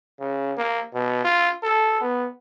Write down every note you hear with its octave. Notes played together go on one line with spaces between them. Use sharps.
C#3
A#3
B2
F4
A4
B3